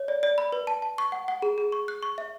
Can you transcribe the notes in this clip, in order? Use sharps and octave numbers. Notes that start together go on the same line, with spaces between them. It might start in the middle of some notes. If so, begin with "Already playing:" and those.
Already playing: C#5
D5
D5
B5
B4
A5
A5
C#6
F#5
F#5
G#4
G#4
C#6
F#6
C#6
E5